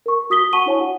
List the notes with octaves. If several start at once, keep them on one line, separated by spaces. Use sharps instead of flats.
A#4 C#6
F#4 D#6 B6 G7
F#5 A5 C#6 D#7 G7
D4 E4 C#5 G#5
F#4 F#5